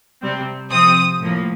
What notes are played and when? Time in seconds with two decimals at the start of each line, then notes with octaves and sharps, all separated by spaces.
0.21 C3 G3 C4
0.71 C3 F3 C4 D#6
1.21 A2 F3 A#3